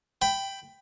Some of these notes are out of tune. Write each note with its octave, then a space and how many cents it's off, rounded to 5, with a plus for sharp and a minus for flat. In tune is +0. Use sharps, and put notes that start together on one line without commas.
G5 +0 B5 +15